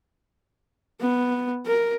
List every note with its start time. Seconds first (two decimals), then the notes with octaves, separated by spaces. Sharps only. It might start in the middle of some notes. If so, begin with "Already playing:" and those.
1.01 B3
1.66 A#4